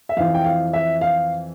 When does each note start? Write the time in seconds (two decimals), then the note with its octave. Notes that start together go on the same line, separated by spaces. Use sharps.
0.09 E5
0.17 F2 E3 F5
0.34 G5
0.44 F5
0.73 E5
1.01 F5